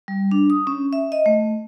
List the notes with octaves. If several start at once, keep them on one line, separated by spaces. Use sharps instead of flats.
G3
D4
D#6
C#4
E5
D#5
A3